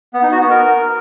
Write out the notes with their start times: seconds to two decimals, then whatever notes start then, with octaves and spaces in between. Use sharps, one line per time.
0.14 B3
0.23 D#4
0.32 F#4
0.41 B3
0.50 A#4